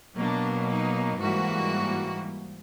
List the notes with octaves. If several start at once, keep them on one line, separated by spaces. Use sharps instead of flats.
B2 F#3 A#3 D4
D#4
G#2 E3 G3 A#3 F#4